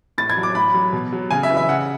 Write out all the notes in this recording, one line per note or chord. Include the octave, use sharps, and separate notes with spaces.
A2 A6
G#6
F#3
D6
A2 B5
F#3
B2
F#3
C#3 G#5
E5
E3
E5
C#3 F#5